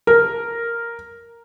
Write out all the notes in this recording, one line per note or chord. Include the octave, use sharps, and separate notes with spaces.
A#4